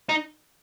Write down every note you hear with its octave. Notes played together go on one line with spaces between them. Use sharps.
D#4